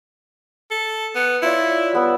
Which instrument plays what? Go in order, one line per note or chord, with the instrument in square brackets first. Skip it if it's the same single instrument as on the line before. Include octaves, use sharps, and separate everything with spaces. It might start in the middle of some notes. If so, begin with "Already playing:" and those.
[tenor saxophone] A4
B3
[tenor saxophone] E4 [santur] F4 C#5 D5
[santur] G3 B3 E6